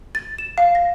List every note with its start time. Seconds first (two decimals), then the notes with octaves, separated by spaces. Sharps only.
0.15 A6
0.38 E7
0.58 F5
0.75 A#6